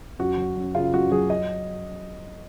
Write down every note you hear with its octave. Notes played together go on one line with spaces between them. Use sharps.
F#2 F#4
F#3
F#2
C#3 F4
F#2 F#4
F#3 G#4
D#5